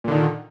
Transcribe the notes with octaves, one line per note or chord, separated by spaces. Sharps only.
A#2 D3 D#3